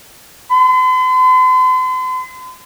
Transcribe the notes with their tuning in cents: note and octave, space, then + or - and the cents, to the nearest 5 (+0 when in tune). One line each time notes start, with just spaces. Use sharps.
C6 -45